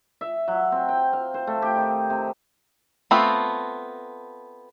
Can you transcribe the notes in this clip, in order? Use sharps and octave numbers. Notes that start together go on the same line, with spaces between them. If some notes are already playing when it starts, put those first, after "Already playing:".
E5
F#3
C4
G5
F5
C5
A3
G4
D#3
C3
A3 B3 C4 F4